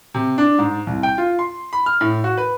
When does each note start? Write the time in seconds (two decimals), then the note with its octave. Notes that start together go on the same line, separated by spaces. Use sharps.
0.14 C3
0.38 D4
0.59 G#2
0.87 C2
1.03 G5
1.18 F4
1.39 C6
1.73 B5
1.86 F6
2.01 A2
2.24 F#4
2.38 B4